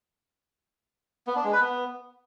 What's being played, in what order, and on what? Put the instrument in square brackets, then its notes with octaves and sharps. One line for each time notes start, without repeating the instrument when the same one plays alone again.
[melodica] B3
D4
G#3
B4
B3